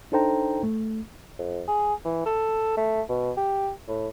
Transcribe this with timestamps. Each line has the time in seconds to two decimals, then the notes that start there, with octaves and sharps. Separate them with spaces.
0.12 D4 D#4 A4 C5 G5 A#5
0.63 A3
1.39 F2
1.68 G#4
2.05 E3
2.26 A4
2.77 A3
3.09 B2
3.37 G4
3.88 A2